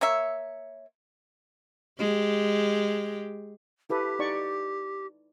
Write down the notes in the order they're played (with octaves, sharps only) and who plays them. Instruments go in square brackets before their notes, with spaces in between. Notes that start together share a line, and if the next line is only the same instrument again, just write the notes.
[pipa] A#3 C#5 E5
[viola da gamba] G#3 G4
[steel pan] E4 A4 B4 [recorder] G4
[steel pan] D#4 D5 C#6